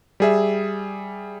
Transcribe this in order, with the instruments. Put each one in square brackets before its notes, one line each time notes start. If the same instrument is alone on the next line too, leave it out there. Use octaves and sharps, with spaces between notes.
[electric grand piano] G3 G#4 E5